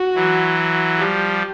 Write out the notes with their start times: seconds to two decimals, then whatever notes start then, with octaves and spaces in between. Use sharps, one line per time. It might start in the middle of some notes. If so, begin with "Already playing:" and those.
Already playing: F#4
0.15 E3 F#3
0.98 F3 G3 G4